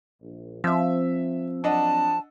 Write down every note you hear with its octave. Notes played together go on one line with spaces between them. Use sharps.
A#1
F3 C4 E5 E6
F#3 C4 D4 D#5 F#5 A5